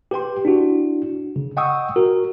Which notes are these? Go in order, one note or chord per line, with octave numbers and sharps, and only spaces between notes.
G4 B4 G5 C6
D4 E4 F#4
C#3
D#5 F#5 G5 C#6 D#6 E6
F#4 A#4